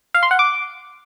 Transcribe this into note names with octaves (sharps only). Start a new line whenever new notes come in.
F5
C6
F#5
D6